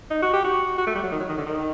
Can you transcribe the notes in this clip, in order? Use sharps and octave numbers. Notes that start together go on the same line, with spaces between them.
D#4
F#4
G4
F#4
F#4
A3
G3
F#3
D#3
F#3
D#3
D3
D#3